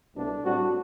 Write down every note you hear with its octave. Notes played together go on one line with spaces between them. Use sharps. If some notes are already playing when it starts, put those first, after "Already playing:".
C2 B2 A3 D4
A2 G3 C4 D4 F#4